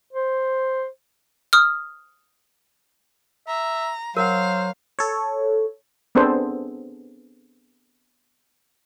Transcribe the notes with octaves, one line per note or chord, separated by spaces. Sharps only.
C5
D#6 F6
E5 A#5
F#3 A#4 C5 F5 F#5
A4 C#5
B3 C4 D4 G#4 A4 C5